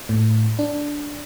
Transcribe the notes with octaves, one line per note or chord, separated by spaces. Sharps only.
A2
D4